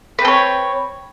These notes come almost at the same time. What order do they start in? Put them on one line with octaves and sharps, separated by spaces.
B4 C4 A4 C#5